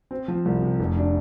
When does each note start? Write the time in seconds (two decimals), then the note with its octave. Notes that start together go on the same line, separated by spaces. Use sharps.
0.11 C4
0.28 F3
0.45 C2
0.62 C3
0.80 F1
0.97 D4